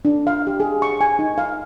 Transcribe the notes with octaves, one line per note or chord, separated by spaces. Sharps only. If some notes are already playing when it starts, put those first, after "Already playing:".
D4
F5
G4
G#4
C#6
G#5
D#4
F5